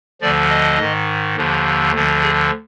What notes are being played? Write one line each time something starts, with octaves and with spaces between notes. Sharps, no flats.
D2 D3 F3 D5
D#5
G#2 D#3
D#2 D3 F3
D2 D3 F3
G#4